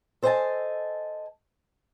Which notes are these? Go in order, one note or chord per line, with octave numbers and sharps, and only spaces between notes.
A4 C5 D#5 F#5 G#5 A5